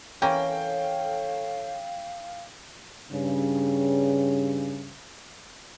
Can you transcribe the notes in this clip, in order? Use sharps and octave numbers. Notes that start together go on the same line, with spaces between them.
E3 A#3 C#4 A4 C#5 F5 G5
G2 C#3